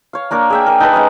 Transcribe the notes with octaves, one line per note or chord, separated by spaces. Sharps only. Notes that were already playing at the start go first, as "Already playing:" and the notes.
C#5 F5
A#3 D4 A#4 C#5
G#4 E5 G5
A#4
D#4 A4 B4 A#5
G#3 C#4 D#5 D#6